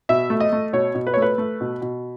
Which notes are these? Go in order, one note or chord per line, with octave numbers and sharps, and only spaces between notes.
B2 E5
A3
D#5
A3
B2 C#5
B2
B4
C#5
A3
B4
A3
B2
B2